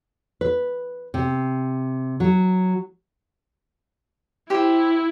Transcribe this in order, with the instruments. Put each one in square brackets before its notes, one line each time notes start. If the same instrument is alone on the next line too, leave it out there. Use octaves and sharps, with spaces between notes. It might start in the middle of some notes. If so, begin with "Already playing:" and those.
[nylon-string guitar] B4
C3
F#3
[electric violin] E4 [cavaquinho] G4 C5